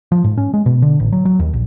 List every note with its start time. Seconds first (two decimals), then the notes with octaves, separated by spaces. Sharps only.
0.12 F3
0.24 G#2
0.38 C#4
0.54 G#3
0.66 B2
0.82 D3
1.00 A1
1.12 F#3
1.25 F#3
1.39 D#2
1.53 A#1